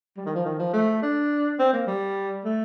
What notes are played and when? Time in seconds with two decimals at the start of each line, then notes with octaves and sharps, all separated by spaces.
0.17 G3
0.26 D#3
0.35 F3
0.45 D#3
0.59 F3
0.73 A3
1.02 D4
1.59 C4
1.73 A#3
1.87 G3
2.45 A3